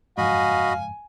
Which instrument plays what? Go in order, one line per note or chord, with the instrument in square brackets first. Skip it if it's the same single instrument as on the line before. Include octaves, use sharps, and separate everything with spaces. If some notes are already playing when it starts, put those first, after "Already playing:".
[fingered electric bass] F#1 F2 G#2 [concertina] F#4 D#5 B5 [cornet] F5 [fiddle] G#5